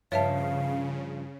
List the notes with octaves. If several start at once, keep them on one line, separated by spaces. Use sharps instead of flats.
G2 C#3 F3 C#5 E5 F5 A5